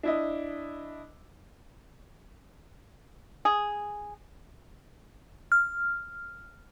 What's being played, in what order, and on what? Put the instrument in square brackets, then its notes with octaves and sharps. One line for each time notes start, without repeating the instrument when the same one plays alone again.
[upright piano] D4 E4 D#5
[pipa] G#4
[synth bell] F6